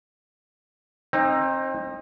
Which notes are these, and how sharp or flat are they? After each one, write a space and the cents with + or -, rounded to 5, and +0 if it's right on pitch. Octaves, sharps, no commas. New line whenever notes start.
C4 +30 D#4 -5